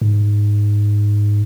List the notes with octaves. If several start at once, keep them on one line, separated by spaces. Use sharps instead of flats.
G#2